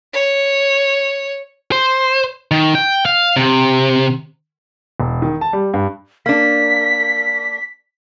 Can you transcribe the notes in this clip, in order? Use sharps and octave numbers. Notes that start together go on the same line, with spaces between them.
C#5
C5
D#3
G5
F5
C3
E1
D#3
A5
G3
G2
A#3 D4 B6